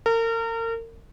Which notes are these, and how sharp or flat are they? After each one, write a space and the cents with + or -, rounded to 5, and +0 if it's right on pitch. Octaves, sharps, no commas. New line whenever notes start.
A#4 -35